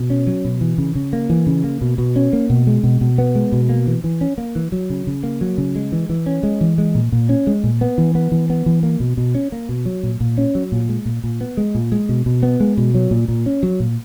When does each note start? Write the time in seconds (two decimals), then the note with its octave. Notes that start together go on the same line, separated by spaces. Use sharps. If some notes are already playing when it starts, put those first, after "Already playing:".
Already playing: B2
0.10 C#4
0.27 F#3
0.45 B2
0.61 E3
0.78 C#3
0.95 C#3
1.13 A#3
1.30 E3
1.47 C#3
1.64 A#3
1.81 B2
1.98 B2
2.16 C#4
2.33 A#3
2.50 B2
2.67 G#3
2.83 B2
3.01 B2
3.18 B3
3.35 G#3
3.52 B2
3.69 A#3
3.87 E3
4.04 E3
4.21 C#4
4.38 A#3
4.55 E3
4.72 F#3
4.90 C#3
5.07 C#3
5.23 A#3
5.41 F#3
5.58 C#3
5.76 G#3
5.92 E3
6.09 E3
6.26 C#4
6.43 G#3
6.61 E3
6.78 G#3
6.95 A#2
7.12 A#2
7.29 C#4
7.47 G#3
7.64 A#2
7.81 B3
7.98 E3
8.15 B3
8.32 E3
8.50 B3
8.66 E3
8.83 A#3
9.00 B2
9.17 B2
9.35 C#4
9.52 A#3
9.69 B2
9.86 F#3
10.03 A#2
10.20 A#2
10.38 C#4
10.55 F#3
10.72 A#2
10.89 G#3
11.05 A#2
11.24 A#2
11.41 B3
11.57 G#3
11.75 A#2
11.92 G#3
12.09 B2
12.26 B2
12.43 B3
12.60 G#3
12.77 B2
12.95 F#3
13.11 A#2
13.28 A#2
13.46 C#4
13.63 F#3
13.80 A#2